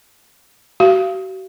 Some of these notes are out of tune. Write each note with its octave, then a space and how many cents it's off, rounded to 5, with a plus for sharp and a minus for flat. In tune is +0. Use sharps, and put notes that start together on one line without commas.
F#4 +40 F5 -25